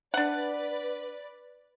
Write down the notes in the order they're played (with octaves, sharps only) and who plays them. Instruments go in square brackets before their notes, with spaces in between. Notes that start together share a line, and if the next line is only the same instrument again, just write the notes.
[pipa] D4 F#5 [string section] B4 D5